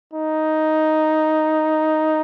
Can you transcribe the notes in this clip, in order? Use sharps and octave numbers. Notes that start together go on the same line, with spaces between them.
D#4